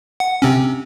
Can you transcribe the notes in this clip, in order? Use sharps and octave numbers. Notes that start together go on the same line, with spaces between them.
F#5
C3 C4 C#4